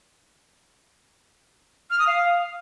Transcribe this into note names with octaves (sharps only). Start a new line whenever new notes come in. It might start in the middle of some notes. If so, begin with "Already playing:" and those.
F6
D#6
F5